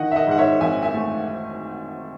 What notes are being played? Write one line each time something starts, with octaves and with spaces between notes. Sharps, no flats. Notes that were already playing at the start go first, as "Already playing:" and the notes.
Already playing: D#3 D#5 F#5
E5
D#5 F#5
G#2 F#5
C#5 E5
G#1 E5 G#5
E5 G#5
A3